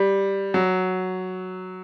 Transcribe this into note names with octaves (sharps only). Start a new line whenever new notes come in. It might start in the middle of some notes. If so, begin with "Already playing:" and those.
Already playing: G3
F#3